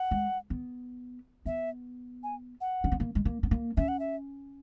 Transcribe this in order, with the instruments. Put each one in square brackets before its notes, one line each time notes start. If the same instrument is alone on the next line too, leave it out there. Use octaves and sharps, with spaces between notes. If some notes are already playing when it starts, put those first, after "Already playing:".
Already playing: [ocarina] F#5
[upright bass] G#3
B3
[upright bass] B3 [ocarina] E5
[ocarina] G#5
F#5
[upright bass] C#4
B3
A#3
G#3
A#3
B3
A#3
[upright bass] C#4 [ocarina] E5
[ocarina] F#5
E5